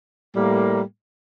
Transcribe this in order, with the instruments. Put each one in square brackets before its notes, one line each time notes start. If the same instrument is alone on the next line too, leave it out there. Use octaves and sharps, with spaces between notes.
[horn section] A2 G3 A#3